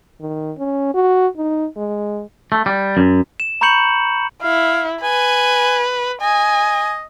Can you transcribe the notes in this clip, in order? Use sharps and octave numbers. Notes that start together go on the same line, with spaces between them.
D#3
C#4
F#4
D#4
G#3
A3
G3
F#2
E7
A#5 B5 C#6 G6 C#7 F#7
E4 F5
B4 G#5
D#5 G#5